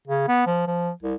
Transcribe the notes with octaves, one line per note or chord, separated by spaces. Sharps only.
C#3
B3
F3
F3
C2